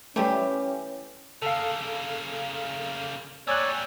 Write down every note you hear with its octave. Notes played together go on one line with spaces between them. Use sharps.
E3 G3 A3 C#4 G4
C#3 A#3 A4 F5
G3 A#3 C#5 D5 G#5 E6 F#6